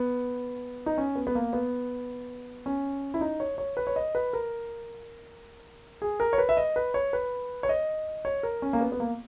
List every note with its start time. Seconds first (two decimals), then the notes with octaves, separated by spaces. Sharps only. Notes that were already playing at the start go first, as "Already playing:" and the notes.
Already playing: B3
0.86 D#4
0.98 C#4
1.16 B3
1.27 B3
1.35 A#3
1.53 B3
2.66 C#4
3.14 E4
3.21 D#4
3.40 C#5
3.58 C#5
3.77 B4
3.87 C#5
3.96 D#5
4.15 B4
4.33 A#4
6.02 G#4
6.20 A#4
6.33 C#5
6.38 B4
6.49 E5
6.57 D#5
6.76 B4
6.94 C#5
7.13 B4
7.63 C#5
7.69 D#5
8.25 C#5
8.43 A#4
8.62 C#4
8.73 A#3
8.81 B3
8.92 B3
9.00 A#3